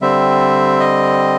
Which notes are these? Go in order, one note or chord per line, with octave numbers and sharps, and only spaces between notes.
D3 G3 C4 E5
D#5